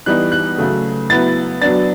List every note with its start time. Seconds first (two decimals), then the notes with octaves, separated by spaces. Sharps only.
0.06 E3 G3 B3 D#4 F#6
0.32 F#6
0.58 C#3 F#3 A3
1.10 F#3 B3 E4 A6
1.62 F#3 B3 D4 A6